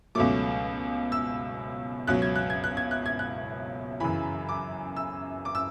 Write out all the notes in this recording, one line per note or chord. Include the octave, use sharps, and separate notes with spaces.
C#2 B2 F#3 A3 D6
E6
C#2 B2 F#3 F#6
G#6
F#6
G#6
F#6
G#6
F#6
G#6
F#6
F#2 C#3 E3 B5
D6
E6
D6
E6